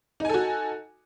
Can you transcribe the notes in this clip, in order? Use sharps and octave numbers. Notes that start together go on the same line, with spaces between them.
D#4 F#4 A4 G#5